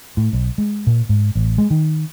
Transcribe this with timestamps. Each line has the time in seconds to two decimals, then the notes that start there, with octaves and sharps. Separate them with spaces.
0.17 A2
0.33 B1
0.58 G#3
0.87 A#2
1.09 G#2
1.35 A1
1.58 G#3
1.71 D#3